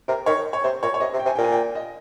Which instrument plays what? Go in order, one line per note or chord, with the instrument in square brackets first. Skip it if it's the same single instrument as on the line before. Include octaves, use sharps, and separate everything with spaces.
[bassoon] C3 [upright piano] A#4
[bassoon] D#3 [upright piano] C#5
[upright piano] C#5
[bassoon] C3 [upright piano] C5
[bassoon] A#2 [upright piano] C#5
[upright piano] C#5
[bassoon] C3 [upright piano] D#5
[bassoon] C3
[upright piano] G5
[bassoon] C3 [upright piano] G#5
[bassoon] A#2 [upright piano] G5
[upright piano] G#5
G5
D#5